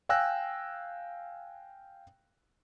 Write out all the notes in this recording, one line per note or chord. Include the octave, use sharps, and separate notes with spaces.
F5 G5 G#5 E6 F#6 A#6